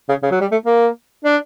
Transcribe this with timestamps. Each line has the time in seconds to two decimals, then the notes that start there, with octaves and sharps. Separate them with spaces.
0.09 C#3
0.23 C#3
0.31 F#3
0.41 G3
0.51 A3
0.66 A#3
1.24 D4